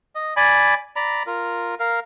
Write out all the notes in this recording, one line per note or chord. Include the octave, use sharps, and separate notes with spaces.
D#5
D5 G#5 B5
D5 A#5 B5
F4 A#4
A#4 F5